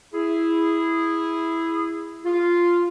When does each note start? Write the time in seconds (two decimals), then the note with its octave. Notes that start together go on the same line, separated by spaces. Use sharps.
0.14 E4 G#4
2.25 F4